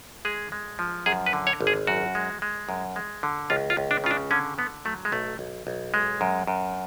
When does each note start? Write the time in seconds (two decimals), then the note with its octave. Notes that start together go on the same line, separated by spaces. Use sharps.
0.25 G#3 G#4
0.52 G#3
0.79 F3
1.06 F#2 G#4
1.26 B4
1.33 D3
1.47 C#5
1.61 G#1
1.67 G#4
1.87 F#2 F#4
2.15 G#3
2.42 G#3
2.69 F#2
2.96 G#3
3.23 D3
3.50 C#2 F4
3.70 F4
3.77 C#2
3.91 D4
4.04 C#3 F4
4.11 D4
4.31 D3 C#4
4.58 D3 B3
4.85 F#3 A3
5.05 G#3
5.12 B1 A3
5.39 B1
5.67 B1
5.94 G#3
6.21 F#2
6.47 F#2